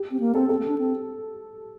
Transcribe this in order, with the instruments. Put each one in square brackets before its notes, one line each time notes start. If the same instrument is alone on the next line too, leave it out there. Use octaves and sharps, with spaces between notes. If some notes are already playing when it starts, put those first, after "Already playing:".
Already playing: [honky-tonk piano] G4
[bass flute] C4
A#3
[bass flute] C4 [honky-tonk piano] A4
[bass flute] C4 [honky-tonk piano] A4
[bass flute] A#3
C4
D4
C4